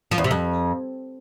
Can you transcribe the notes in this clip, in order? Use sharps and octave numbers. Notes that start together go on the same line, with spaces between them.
F3
E2
C3
F2